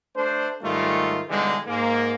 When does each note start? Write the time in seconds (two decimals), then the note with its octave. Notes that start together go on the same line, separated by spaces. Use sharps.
0.15 A3 D4 C5
0.62 G#2 D#3 G3 A3 F4
1.29 B1 D3 E3 G3 G#3
1.66 G#2 A#3